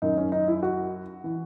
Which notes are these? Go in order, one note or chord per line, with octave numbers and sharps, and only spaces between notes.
F#2 D#3 D#4
C#4
D#4
E4
F#4
E3